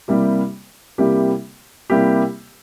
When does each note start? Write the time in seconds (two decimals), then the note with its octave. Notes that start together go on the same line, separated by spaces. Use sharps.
0.08 C3 G3 A#3 E4 G4
0.98 C3 G3 A#3 E4 G4
1.90 C3 G3 A#3 E4 G4